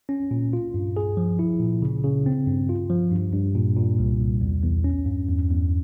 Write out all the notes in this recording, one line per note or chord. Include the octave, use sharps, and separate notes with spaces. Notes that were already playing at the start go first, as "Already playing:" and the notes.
C#4
A#2
F4
G2
G#4
F3
E4
A#2
C#3
C#3
C4
G2
F4
F3
G2
G2
A#2
A#2
C2
C2
E2
E2
C#4
G2
E2
E2